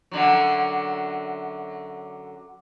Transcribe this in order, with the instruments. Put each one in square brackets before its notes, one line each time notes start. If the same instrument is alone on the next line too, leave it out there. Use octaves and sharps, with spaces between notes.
[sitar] F#2 D3 F#3